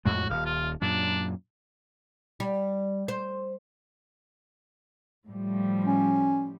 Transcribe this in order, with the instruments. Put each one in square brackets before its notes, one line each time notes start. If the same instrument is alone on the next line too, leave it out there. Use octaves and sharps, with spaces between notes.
[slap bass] F2 A2 G#3 [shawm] F#4
[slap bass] D#1 [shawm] F5
[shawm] F4
[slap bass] F#2 A#2 [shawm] D4
[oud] G3
C5
[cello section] A2 F3 G3
[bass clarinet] C#4